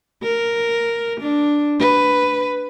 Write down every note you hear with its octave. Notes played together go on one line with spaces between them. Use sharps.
A#4
D4
B4